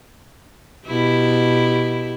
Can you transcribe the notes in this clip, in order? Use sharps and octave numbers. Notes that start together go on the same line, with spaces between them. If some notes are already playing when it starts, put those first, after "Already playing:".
B2 E4 G4